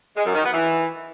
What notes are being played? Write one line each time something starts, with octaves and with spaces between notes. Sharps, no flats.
G#3
F#2
D#3
B3
E3